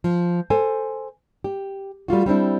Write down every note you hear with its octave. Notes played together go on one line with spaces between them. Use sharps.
F3
A4 C5 G#5
G4
G3 A3 F4 F#4
G3 C4 D4 E4